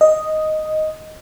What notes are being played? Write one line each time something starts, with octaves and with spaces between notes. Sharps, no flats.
D#5